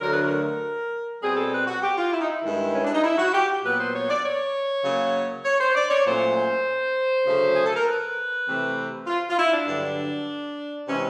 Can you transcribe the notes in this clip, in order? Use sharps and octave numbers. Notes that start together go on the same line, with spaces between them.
D2 D3 F#3 A3 A#4
B4
A#4
B2 G3 C4 G#4
A4
B4
F#4
G4
F4
E4
D#4
E4
G2 D#3 G#3
C#4
D4
D#4
E4
F#4
G4
A#2 F#3 B3 B4
C5
C#5
D5
C#5
C#3 F#3 A#3 C#4
C#5
C5
D5
C#5
A#2 F#3 A3 C#4 C5
D2 C#3 F#3 A3
G#4
A4
A#4
B4
C3 E3 A3 C4
F4
F4
E4
D4
G2 D3 F#3
C3 E3 G#3 C#4